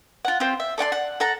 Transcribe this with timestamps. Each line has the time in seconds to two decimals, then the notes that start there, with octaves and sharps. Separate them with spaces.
0.25 F4 F#5
0.40 C4 F4 G4 C5
0.60 E5
0.78 A4 D5 F#5 C6
0.92 F#5
1.20 A4 F#5 A#5